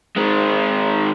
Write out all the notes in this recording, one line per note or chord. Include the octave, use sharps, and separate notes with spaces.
D#3 G#3